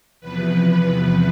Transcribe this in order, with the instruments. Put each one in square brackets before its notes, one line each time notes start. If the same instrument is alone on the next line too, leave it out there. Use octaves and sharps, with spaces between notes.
[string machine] E2 C3 F3 B4